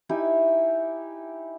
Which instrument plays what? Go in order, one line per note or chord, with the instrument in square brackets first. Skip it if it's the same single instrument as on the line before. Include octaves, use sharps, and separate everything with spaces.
[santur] D#4 E4 G4 G#5